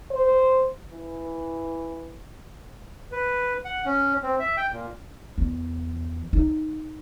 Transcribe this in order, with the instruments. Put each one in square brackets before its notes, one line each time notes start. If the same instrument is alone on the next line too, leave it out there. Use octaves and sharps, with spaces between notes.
[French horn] C5
E3
[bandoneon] B4
F#5
C#4
C4
E5
G5
A#2
[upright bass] E2
D#4